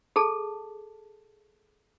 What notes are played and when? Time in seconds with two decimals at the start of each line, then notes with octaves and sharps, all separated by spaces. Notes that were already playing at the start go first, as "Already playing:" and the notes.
0.16 G#4 A4 A5